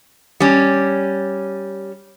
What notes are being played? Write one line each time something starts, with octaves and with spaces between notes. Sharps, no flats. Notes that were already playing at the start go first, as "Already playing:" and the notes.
G3 C#4